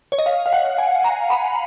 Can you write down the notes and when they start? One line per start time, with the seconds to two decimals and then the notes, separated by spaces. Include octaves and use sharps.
0.12 C#5
0.18 D#5
0.26 F5
0.46 F5
0.53 F#5
0.78 G#5
1.04 A#5
1.30 B5